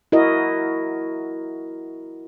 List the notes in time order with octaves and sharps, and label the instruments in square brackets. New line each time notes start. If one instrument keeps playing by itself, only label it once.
[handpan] E4 F#4 A#4 D#5